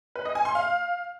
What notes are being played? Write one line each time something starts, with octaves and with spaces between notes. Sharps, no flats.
B4
D#5
G#5
C6
F5